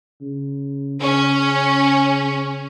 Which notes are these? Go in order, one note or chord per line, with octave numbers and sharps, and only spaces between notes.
C#3
C#3 C#4